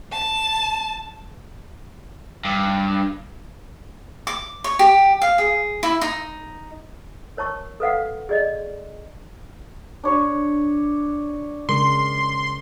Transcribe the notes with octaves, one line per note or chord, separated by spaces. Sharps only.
A5
G2
D6
C#5
G4
F5
G#4
E4
D#4
A#4 C#5 A5 C#6
A4 B4 F5 F#5
G#4 D5 D#5
D4 C#5
C#3 G#3 A#4 C6